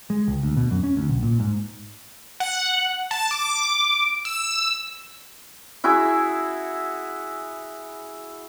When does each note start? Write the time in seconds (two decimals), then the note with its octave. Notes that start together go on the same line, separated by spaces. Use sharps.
0.10 G#3
0.28 C#2
0.43 D2
0.57 B2
0.71 F#2
0.84 C#4
0.97 D2
1.09 B1
1.23 A#2
1.40 G#2
2.40 F#5
3.11 A5
3.31 D6
4.25 E6
5.84 E4 F#4 G#4 E5